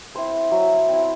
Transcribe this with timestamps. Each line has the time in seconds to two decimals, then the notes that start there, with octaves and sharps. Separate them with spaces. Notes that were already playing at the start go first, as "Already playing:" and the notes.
0.15 C4 E4 C5
0.52 F#3 E5
0.88 C4 E4